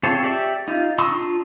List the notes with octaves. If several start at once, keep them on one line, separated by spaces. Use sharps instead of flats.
C4 F4 G#4 A4 C#5
G4 D5 E5
D#4 F4
A#5 C6 C#6 D#6 E6
D4 F4